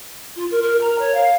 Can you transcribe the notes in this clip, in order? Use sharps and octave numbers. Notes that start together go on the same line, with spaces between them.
F4
A#4
A#4
A#5
C#5
F5